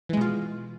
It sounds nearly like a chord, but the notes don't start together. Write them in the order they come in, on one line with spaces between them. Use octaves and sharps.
E3 G#3 B2 F4